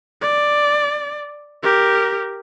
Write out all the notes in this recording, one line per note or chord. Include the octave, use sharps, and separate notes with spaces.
D5
G4 A#4